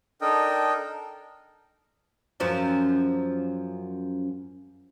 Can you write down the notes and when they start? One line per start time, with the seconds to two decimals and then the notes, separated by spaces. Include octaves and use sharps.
0.21 D4 D#4 A4 A#4 D#5 G5
2.40 F#2 F3 C#4